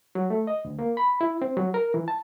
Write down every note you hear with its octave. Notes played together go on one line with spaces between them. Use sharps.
F#3
A3
D#5
D2
A#3
B5
E4
C4
F#3
A#4
E3
A5